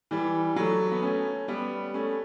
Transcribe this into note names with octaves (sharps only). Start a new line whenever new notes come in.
E3 G3
F#3 A3
B3
A3 C#4
G3 B3
A3 C#4